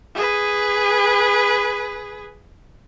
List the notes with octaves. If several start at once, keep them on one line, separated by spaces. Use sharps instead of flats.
G#4 B4